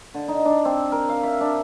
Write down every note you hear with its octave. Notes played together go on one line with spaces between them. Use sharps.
D3
D#4
D4
C4
A#4
F5
E5
D4